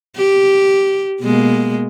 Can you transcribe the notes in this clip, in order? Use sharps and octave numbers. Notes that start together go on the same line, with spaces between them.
G4
B2 G#3 A#3